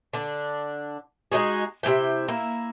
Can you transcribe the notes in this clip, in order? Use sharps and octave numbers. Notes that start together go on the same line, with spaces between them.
D3 D4
G#3 D#4 F#4 G#4
C3 B3 E4 G5
A#3 E4